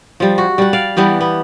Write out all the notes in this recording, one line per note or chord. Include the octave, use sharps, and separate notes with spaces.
F3 G3
F#4
G3 F#5
D5 F5
E3 G3 B3 G4
B3